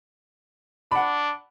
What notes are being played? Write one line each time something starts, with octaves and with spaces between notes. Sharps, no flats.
D4 F#5 B5